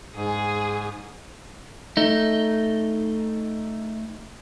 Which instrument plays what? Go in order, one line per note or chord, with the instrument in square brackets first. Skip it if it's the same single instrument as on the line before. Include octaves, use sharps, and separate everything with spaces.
[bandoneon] G#2 [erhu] G#4
[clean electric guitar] A3 D#4